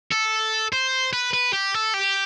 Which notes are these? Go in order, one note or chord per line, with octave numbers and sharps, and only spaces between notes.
A4
C5
B4
B4
G4
A4
G4